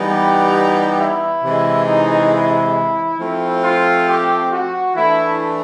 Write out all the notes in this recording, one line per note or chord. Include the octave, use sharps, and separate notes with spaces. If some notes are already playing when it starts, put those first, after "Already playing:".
Already playing: E3 G3 B3 D#4
G4
E4
C3 E3 G#3
D#4
E4
F3 A3 C4
F4
G4
F#4
E3 A3 D4 E4